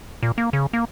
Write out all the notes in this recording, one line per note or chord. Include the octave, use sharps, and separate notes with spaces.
A#2
A#3
C#3
A#3